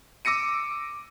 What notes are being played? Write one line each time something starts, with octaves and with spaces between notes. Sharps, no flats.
D6 E6 A#6 C#7 D#7